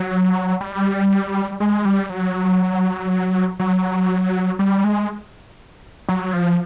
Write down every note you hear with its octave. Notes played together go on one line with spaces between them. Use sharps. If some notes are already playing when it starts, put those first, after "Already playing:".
Already playing: F#3
G3
G#3
G3
F#3
F#3
G3
G#3
F#3
F3